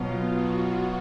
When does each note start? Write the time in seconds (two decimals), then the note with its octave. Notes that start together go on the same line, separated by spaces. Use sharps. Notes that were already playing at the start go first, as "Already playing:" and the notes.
Already playing: B2 F#3 B3 F4
0.32 F#4